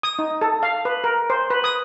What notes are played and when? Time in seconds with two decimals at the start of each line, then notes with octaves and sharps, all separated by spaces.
0.03 D#6
0.19 D#4
0.42 A4
0.63 F5
0.85 B4
1.04 A#4
1.30 C5
1.50 B4
1.64 D#6